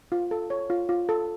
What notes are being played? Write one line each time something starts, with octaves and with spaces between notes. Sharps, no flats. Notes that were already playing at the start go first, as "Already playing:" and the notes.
F4
A4
C#5
F4
F4
A4